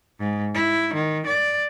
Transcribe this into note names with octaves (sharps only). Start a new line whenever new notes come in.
G#2
E4
D#3
D5